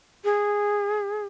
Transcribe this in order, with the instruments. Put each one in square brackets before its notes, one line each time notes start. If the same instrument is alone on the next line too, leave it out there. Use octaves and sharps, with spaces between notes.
[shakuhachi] G#4